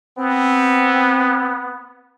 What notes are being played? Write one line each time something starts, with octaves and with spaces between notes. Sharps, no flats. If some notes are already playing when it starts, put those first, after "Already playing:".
B3 C4